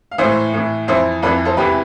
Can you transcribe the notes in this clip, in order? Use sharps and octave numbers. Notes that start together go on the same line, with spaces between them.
F5
A2 E3 C5 E5
A2 E3
F2 E3 C5 E5
F2 E3 B4 D5
A4 C5
E2 C3 E3 G4 B4